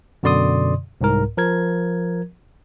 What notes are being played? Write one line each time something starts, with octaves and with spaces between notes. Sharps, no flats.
F#2 B2 D3 D5 C6 D#6
C2 G#2 A#4
F3 A#4 G#6